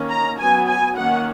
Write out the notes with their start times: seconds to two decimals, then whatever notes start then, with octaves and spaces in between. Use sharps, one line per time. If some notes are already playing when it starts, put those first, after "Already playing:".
Already playing: D#3 A#3 C#4
0.10 A#5
0.38 F#3 B3 G#5
0.67 G#5
0.96 D#3 A#3 C#4 F#5